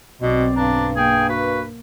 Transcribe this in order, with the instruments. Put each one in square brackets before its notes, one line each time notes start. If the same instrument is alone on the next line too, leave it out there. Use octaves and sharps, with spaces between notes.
[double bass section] B1 C4 [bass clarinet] B2 [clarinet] D5
[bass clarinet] G2 [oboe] D4 [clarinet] A#5
[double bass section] A#3 [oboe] G#4 [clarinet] G5
[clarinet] F#4 [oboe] B4